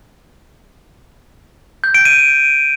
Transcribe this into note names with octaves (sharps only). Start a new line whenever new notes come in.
G6
D7
D#7